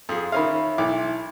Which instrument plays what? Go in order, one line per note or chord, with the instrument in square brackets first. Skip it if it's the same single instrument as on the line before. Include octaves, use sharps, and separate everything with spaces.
[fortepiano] F2 G#4
[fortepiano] D#3 C#4 F5 [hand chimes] E5 B5
[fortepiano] B1 E3 D6